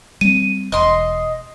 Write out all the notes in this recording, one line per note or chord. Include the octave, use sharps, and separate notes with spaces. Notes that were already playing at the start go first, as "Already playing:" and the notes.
G3 C4 D#7
E1 D#5 C6